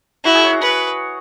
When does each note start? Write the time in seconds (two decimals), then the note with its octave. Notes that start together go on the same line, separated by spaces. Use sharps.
0.24 E4 F#4
0.35 G#4
0.44 C#5
0.53 F#5
0.62 B4